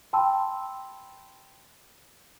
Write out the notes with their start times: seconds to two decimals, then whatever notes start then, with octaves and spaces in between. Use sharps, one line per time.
0.13 G5 A5 B5 C6 E6